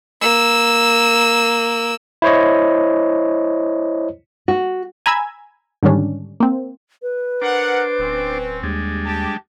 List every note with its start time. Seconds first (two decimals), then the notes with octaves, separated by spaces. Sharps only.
0.21 A#3 E6
2.22 E4 C5 C#5 D#5
4.48 F#4
5.06 G#5 A#5 B5 E6 G#6
5.83 G#2 D3 D#3 G3 C#4 D4
6.40 A#3 C4
7.02 B4
7.42 D4 A#4 C5 F#5 D6
7.99 D1 C4 C#4
8.63 D#2 G3 G#3 D4
9.05 G4 A5